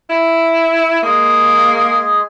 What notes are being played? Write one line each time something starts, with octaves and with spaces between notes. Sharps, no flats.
E4 B5 E6
G#3 A#3 G#4